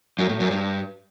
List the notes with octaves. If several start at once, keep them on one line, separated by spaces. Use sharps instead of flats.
F#2
A2
F#2
G2